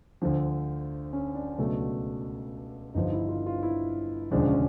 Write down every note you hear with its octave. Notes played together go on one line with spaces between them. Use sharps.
D2 D3 F3
C#4
D4
C#2 B2 F#3 A3
G1 G2 D3 F3 D#4
E4
F4
F4
E4
E1 D2 C#3 F3 G#3 D4
C#4